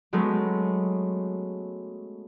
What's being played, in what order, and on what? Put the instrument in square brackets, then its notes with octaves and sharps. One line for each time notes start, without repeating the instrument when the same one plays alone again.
[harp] F#3 G#3 A3 B3 C#4